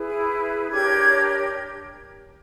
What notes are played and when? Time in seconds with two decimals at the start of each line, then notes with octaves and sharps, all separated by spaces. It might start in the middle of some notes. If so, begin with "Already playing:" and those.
Already playing: E4 G#4 B4
0.71 D4 G4 A#4 C#5 G#6